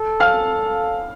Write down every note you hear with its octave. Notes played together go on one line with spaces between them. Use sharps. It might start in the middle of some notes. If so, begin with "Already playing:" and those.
Already playing: A4
F5 F6